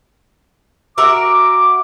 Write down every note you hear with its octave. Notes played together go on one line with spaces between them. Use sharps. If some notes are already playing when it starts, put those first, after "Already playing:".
F#4 A#4 E5 D6